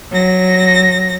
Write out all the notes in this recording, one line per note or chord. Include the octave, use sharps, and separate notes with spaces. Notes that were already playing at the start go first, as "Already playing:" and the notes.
F#3 A#6